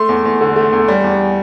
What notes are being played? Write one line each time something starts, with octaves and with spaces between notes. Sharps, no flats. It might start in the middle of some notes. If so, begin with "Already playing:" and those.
Already playing: A3 C6
E2
E2
D3
A3
E2
G3
E2